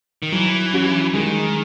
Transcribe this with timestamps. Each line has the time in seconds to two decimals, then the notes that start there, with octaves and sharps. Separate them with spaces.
0.23 D#3
0.32 E3 F#3
0.73 C#4 F#4
1.14 D#3 G#3